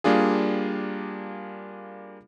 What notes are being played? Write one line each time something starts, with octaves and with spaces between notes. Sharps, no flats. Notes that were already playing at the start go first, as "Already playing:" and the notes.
G3 A#3 D4 F4 G#4